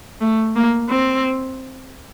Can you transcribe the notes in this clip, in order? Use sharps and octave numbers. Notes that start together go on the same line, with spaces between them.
A3
A#3
C4